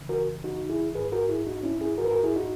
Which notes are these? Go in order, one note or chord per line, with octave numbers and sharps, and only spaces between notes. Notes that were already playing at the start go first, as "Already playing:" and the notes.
Already playing: F#2 C#3 E3
F#4 A#4
D#4 F#4
E4 G#4
G#2 D#3 G#4 B4
F#4 A#4
E4 G#4
D#4 F#4
C#4 E4
E4 G#4
G#2 D#3 F#4 A#4
B4
F#4 A#4
E4 G#4
D#4 F#4